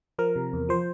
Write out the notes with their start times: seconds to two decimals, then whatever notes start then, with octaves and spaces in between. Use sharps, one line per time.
0.19 F3 A#4
0.36 C3
0.53 E2
0.69 F3 C5